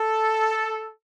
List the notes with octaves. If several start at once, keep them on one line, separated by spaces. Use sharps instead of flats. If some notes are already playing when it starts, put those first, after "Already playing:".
Already playing: A4